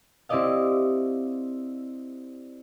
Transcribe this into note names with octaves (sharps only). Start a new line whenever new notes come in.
C4 E4 G4 D5 D#5 F5